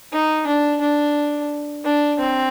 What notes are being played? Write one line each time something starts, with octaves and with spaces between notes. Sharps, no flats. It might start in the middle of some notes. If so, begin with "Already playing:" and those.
D#4
D4
D4
D4
C4